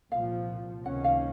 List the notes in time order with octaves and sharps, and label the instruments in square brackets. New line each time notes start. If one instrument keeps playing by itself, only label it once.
[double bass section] C2 A#2 F3 [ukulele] F5
[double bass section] C#2 C3 D#3 A#3 C#4 [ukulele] F#5
[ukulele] F5